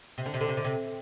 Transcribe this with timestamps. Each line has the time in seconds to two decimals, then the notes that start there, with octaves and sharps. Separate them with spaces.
0.18 C3
0.26 D3
0.34 C3
0.41 D3
0.49 C3
0.57 D3
0.64 C3